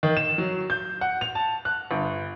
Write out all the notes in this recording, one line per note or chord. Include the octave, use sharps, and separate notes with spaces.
D#3
E7
F#3
G6
F#5
F7
A5
F#6
G1